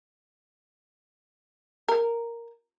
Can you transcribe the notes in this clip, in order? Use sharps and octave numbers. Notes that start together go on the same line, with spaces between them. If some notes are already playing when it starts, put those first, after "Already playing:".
A#4